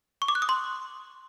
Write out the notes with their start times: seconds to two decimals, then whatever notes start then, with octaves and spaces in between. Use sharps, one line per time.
0.22 C#6
0.28 D6
0.35 F#6
0.42 D#6
0.49 C6